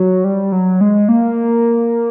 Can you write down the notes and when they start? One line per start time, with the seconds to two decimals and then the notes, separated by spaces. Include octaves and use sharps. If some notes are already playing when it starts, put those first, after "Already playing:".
Already playing: F#3
0.24 G3
0.52 F#3
0.81 G#3
1.09 A#3